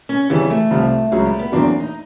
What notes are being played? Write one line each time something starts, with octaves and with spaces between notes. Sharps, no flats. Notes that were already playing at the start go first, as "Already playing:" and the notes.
C#4
F2 C#3 E3 G3 B3
A3
C2 C3 F3
C#2 C#3 F#3 G#3
G3
B3
E2 B2 F#3 A#3 C4 D4
D#4